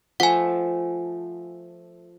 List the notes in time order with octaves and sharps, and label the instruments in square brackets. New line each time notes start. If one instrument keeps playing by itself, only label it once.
[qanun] F3 A3 [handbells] F#5 G#5